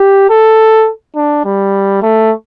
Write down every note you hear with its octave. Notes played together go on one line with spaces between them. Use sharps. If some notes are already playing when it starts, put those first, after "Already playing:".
Already playing: G4
A4
D4
G3
A3